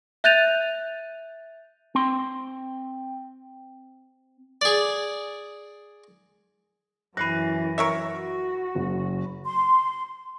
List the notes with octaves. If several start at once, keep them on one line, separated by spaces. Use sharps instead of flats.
E5 F#6 G6 A6 D#7 F7
C4 C6
G#4 D5
F#2 E3 B5 F#6 A#6 C7 D#7
A#4 C#5 E5
F#4
F#1
C6